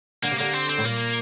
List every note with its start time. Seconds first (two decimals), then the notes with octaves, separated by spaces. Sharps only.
0.23 D3 A#3
0.31 C3
0.38 D3 A#3
0.53 C4
0.69 C4
0.78 A2
0.85 A#2 A#3